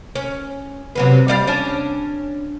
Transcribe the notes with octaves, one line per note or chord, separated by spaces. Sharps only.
C#4
C3 F#3 B3
G3 D5 F5
C#4 D4